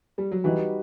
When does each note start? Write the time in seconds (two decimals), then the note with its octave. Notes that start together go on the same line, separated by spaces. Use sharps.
0.18 G3
0.32 F#3
0.44 E3 G3 D#4 F#4 B4